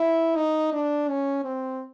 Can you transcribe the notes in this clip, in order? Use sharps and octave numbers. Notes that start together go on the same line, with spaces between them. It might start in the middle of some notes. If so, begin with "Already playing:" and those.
Already playing: E4
D#4
D4
C#4
C4